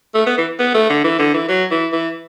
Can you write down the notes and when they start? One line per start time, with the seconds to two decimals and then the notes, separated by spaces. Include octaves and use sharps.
0.14 A3
0.26 B3
0.38 E3
0.59 B3
0.74 A3
0.89 D3
1.04 E3
1.19 D3
1.34 E3
1.48 F#3
1.71 E3
1.92 E3